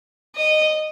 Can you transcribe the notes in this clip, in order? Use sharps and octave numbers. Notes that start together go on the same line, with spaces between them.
D#5